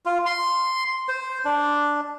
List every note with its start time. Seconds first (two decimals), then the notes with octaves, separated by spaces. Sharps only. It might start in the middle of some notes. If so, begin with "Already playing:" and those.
0.05 F4
0.26 C6
1.08 C5
1.45 D4